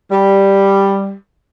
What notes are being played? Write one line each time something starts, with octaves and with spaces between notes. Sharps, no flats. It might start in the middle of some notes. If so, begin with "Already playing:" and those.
G3